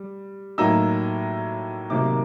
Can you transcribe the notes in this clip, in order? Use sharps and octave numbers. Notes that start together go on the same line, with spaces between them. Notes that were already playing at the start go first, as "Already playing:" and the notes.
Already playing: G3
A2 F#3 A#3 D#4 E6
C3 D#3 F#3 A#3 D#4 D6